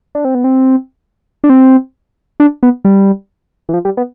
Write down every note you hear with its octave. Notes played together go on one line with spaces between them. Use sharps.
D4
C4
B3
C4
D4
C4
D4
B3
G3
E3
F3
G3
B3